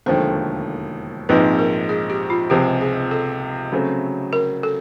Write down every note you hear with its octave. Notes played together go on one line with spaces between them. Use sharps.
E1 D#2 D3 F3 A3 C5
A#1 G#2 F3 G#3 C4 B4
A#4
G#4
G4
F4
C#2 C3 F3 G#3 G4
G#4
A4
C#3 F#3 A3 C4
A#4
A4